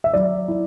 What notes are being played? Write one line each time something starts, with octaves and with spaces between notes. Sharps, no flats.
E5
F#3 D5
E4